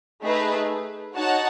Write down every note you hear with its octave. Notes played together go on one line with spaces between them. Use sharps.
A3 D#4 G#4 B4
D#4 F#4 C#5 F#5 A5